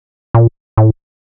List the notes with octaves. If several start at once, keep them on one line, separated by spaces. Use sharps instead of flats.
A#2
A2